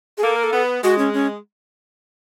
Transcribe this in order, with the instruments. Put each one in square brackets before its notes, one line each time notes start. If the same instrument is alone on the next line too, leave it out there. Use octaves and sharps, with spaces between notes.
[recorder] G#4
[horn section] A#3 [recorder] A4
[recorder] A#4
A4
[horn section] B3
[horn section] G#3 [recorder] F#4
[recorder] C#4
C#4